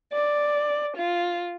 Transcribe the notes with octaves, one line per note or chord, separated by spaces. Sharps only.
D5
F4